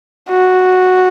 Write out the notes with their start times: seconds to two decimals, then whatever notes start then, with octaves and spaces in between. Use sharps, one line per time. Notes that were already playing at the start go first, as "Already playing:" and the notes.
0.29 F#4